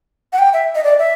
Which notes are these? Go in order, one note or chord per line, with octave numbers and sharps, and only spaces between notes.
F#5
G5
E5
D#5
D5
E5